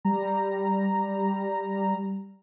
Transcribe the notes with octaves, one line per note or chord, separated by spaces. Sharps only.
G3 A#5